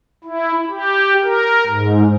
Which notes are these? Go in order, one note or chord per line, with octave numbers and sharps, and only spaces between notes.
E4
G4
A#4
G#2